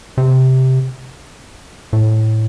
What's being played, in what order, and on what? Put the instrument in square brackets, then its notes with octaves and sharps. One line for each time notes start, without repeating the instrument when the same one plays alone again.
[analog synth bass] C3
A2